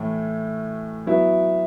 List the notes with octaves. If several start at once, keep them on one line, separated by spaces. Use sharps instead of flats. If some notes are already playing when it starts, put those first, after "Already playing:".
Already playing: A2 E3 A3
F#3 B3 E4